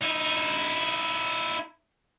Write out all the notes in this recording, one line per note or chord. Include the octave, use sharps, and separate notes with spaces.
D#4 E4